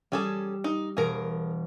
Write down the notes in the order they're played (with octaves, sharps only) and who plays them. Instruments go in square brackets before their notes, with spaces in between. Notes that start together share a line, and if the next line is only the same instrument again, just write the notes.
[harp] G3 [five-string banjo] C#4 G#4 A4
[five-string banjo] D#4
[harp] E1 D7 [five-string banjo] G#4 A#4